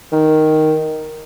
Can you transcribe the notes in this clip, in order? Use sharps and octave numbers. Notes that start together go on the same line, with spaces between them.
D#3